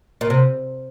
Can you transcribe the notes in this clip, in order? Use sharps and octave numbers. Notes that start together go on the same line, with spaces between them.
A#2
C3